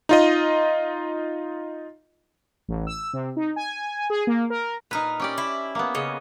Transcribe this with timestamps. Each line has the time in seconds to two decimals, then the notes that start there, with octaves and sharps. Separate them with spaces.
0.09 D#4 F4 D#5
2.68 A1
2.87 E6
3.13 C3
3.36 D#4
3.56 G#5
4.10 G#4
4.27 A#3
4.50 A#4
4.91 A#2 D#4 A#4 B4
5.20 C#4 G4 D5
5.38 E4
5.75 A#3 B3
5.95 C#3 C#5 D#5